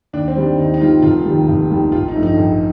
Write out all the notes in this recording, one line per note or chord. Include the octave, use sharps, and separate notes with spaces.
D#2 D4
C4
D#3 G3
D4
D#2 D#4
D#4
D#3 G3 F4
F1 F4
D#2 D#3 G3
F1
D#2 D#3 G3
A1 F4
D#4
G2 F3 A3
D#4
A1